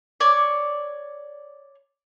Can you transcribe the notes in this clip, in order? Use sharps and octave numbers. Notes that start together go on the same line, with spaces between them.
C#5 D5